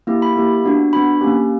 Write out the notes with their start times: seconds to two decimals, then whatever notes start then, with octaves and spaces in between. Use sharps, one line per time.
0.07 A#3 E4 G4
0.22 B5
0.36 A#3 E4 G4
0.65 B3 D4 F#4
0.93 B3 D4 F#4 B5
1.21 A#3 C#4 G4